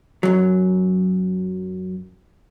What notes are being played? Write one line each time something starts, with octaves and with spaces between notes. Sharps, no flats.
F#2 F#3